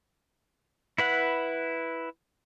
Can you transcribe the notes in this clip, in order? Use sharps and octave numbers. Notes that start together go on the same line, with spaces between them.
E4 B4 F#5